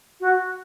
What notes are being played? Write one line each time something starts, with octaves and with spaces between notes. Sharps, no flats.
F#4